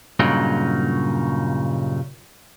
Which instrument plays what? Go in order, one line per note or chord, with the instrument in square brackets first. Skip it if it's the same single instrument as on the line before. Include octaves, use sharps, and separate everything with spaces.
[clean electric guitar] G2 A#2 C#3 F#3 D#4